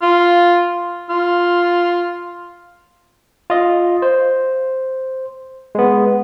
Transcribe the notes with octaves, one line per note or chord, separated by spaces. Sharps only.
F4
F4
F4 D#5
C5
G#3 B3